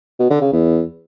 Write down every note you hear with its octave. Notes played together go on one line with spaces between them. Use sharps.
B2
D3
C#3
E2